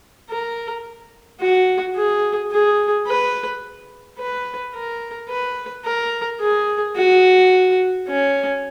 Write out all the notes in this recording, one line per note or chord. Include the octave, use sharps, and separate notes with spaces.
A#4
F#4
G#4
G#4
B4
B4
A#4
B4
A#4
G#4
F#4
C#4